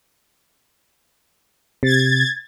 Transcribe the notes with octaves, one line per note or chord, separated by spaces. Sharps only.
C3 G#6 A6